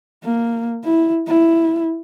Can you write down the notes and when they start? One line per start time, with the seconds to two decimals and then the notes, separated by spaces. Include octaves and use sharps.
0.24 A#3
0.84 E4
1.27 E4